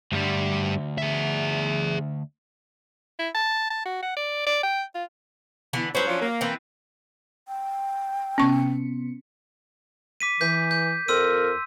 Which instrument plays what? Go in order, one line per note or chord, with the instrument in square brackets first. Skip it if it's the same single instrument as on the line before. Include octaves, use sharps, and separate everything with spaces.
[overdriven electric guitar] D2 [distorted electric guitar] G2 G3
[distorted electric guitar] G#4 E5
[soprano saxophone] E4
A5
A5
F#4
F#5
D5
D5
G5
F4
[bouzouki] D3 E3 B3
[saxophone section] G2 B4 C5 [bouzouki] F#3 C#4
[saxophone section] F3 D4 F4
A#3
[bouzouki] E3 C4
[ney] G5
[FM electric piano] C3 B3 C#7 [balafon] C#4 C#6
[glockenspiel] D6 B6 D#7
[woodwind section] E3 [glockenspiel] G6 B6
[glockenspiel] G6
[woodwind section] F2 A#4 [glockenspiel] C6 E6 D#7